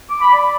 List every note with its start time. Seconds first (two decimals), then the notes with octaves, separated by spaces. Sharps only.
0.09 D6
0.20 B5
0.31 D5 D6